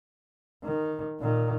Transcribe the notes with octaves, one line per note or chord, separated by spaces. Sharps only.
D#3
A#2 D#3